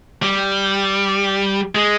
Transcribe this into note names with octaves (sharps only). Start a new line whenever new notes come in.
G3
G#3